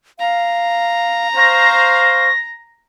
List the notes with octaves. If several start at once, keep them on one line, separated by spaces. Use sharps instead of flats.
F5 A#5
C5 F5 C#6 A#6